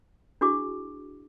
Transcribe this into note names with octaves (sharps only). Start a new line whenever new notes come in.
D4 E4 F#4 G#4 C#6 D6